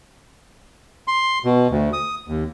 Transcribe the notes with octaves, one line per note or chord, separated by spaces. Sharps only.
C6
B2
D2
D#6
D#2